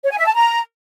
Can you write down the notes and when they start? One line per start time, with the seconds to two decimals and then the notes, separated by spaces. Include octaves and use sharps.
0.04 C#5
0.11 G#5
0.18 E5
0.26 A5
0.33 A#5